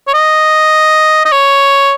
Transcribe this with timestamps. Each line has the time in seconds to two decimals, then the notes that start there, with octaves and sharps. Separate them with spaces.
0.07 C#5
0.14 D#5
1.25 D#5
1.32 C#5